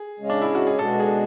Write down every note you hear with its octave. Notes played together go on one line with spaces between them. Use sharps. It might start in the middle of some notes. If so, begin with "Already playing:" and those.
Already playing: G#4
C#3 G#3 C#4
D4
E4
F#4
G#4
B2 G#3 D4 F#4 A4
G#4